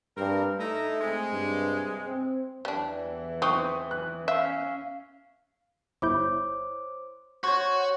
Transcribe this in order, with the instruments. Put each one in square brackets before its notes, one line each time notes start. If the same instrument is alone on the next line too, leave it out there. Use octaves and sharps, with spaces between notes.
[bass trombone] G2 [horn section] C4 G4 A#4
[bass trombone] A3 [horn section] D#4 E4
[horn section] C3 G#3
[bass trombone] G2
C4
[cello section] E2 E3 [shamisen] G3 D4
[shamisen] C4 D#4 [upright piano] C#6 D#6 F#6
[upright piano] F#6
[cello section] C#4 [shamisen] E5 [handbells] F5
[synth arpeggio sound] G1 E4 G6 [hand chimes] C5 C#5 D6
[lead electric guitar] F#4 [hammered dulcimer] C5 C#5 [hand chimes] C#6 G#6